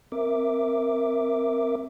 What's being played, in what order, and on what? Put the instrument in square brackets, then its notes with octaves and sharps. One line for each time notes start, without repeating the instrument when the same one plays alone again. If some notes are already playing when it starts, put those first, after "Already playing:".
[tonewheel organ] C4 A#4 E5 D6